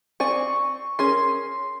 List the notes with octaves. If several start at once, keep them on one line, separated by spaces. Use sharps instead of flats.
C4 D5 G#5 C#6
C#4 G#4 A#4 C6